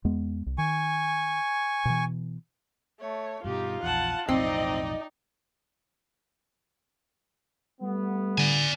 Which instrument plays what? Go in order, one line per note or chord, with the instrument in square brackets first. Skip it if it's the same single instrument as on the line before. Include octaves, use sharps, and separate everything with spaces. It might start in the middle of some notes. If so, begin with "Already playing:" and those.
[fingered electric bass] E2 G#3 B3
C2
[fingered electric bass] D#3 [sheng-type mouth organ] G#5 C#6
[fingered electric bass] B2 E3
[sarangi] A3 [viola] C#5
[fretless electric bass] G2 B2 [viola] D#4 G4 [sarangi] F4
[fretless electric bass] A#1 E2 [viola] F#5 A5
[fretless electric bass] B1 F2 A2 [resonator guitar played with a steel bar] C4 [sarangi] D#4 [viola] D5 D#5
[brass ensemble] G3 A3 B3
[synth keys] D3 [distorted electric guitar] D5 G#5